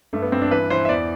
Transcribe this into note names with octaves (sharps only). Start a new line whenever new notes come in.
G2 A3
B3
G2 C4
D4
E3 B4
E3 C5
E5
E2 D5